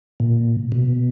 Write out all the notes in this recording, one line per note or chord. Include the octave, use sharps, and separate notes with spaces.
A#2
B2